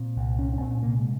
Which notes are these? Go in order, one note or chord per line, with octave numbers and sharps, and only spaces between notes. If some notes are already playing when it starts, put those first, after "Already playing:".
Already playing: A#2 C4
C2
A#2 C#4
C#4
A#2 C4
C3 A#3
G#3